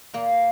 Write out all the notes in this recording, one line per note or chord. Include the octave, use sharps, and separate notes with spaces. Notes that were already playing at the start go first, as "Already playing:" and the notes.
A#2 A#3